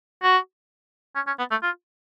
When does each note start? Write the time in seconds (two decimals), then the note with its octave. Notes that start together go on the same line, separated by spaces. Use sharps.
0.23 F#4
1.16 C#4
1.27 C#4
1.39 B3
1.51 A3
1.63 F4